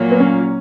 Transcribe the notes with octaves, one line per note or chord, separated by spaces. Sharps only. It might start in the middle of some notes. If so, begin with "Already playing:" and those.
Already playing: A#2 F#3 A#3
B3
C#4